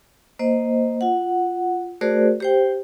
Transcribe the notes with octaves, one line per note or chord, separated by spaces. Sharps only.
A#3 C5 D#5
F4 F#5
A3 F#4 G#4 A#4 C5 D5
G4 C5 G5